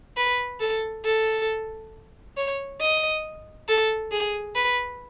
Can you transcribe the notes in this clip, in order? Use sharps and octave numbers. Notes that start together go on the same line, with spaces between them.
B4
A4
A4
C#5
D#5
A4
G#4
B4